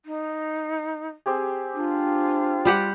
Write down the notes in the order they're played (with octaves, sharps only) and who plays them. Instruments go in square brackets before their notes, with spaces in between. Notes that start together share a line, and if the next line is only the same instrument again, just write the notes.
[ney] D#4
[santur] C4 G4 G#4
[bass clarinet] D4 [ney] F4
[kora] G3 G4 F#5